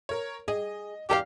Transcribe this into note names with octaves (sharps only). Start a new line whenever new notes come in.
A#4 C#5
G#4 D#5
E2 G4 A4 F5